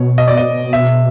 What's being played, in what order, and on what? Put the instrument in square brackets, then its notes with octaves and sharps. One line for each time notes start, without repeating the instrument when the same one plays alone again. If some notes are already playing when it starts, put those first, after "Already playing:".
Already playing: [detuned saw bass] B2 [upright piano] C#5
[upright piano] D#5
D5
D#5
E5